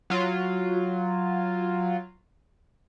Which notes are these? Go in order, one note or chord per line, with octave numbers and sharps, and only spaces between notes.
F#3 F4